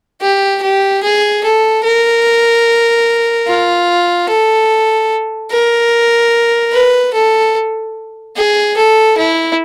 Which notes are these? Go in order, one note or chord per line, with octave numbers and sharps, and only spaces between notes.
G4
G4
G#4
A4
A#4
F4
A4
A#4
B4
A4
G#4
A4
E4